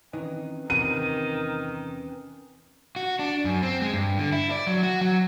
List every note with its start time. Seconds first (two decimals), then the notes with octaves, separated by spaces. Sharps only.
0.13 D#3 E3 C4 C#4 D#4 B4
0.70 E2 C3 D#3 D#7
2.96 F#4
3.19 D4
3.45 F#2
3.63 C4
3.82 G#3
3.94 G2
4.19 D3
4.33 E4
4.52 D5
4.67 F#3
4.83 F#4
5.01 F#3